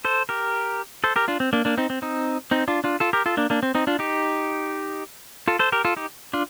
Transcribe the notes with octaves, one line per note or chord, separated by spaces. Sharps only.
A4 C5
G4 A#4
A4 C5
G4 A#4
D4 F4
C4
A#3 D4
A#3 D4
C4 D#4
C4
C4 D#4
C4 D#4
D4 F4
D4 F4
F4 A4
G4 A#4
F4 A4
A#3 D4
A#3 D4
C4
C4 D#4
D4 F4
D#4 G4
F4 A4
A4 C5
G4 A#4
F4 A4
D#4 G4
D4 F4